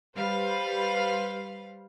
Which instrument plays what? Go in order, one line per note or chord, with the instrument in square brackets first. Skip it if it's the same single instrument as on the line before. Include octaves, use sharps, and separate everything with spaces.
[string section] G3 B4 C5 F5